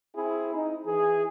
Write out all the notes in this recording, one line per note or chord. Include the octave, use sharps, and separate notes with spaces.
C4 E4 G#4
D#4
E3 G#4